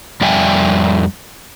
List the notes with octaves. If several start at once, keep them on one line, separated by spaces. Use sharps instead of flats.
F2 G3 D5 E5 G5 G#5